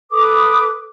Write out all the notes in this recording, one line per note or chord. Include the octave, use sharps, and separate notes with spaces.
A4 B4 D6 D#6